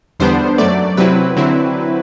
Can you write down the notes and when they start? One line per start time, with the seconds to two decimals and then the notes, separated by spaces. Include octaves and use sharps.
0.20 E2 D3 G3 B3 D4 C5
0.58 F#2 F#3 A3 D5
0.97 C3 F#3 C4 E4 B4
1.37 D3 F#3 C4 E4